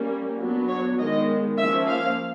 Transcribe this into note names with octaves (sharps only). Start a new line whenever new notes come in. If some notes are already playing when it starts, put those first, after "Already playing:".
Already playing: G3 A#3 C#4
F#3 B3 D4
C#5
D#3 G#3 B3 D#5
F3 A#3 C#4 E5
F5